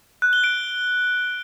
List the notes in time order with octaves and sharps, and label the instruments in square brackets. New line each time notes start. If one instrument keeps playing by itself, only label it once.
[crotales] F#6
G7
D7